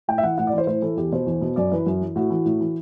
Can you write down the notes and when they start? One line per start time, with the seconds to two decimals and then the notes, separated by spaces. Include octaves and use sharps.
0.08 A2 G5
0.18 E5
0.23 E3 F#5
0.38 A2 F#5
0.47 D5
0.53 E3 C5
0.67 A2 C5
0.82 E3 A4
0.97 E2 G4
1.12 B2 C5
1.26 E2
1.41 B2
1.56 F#2 D5
1.72 E3 B4
1.86 F#2
2.01 E3
2.16 A2 F#4
2.30 E3
2.45 A2
2.61 E3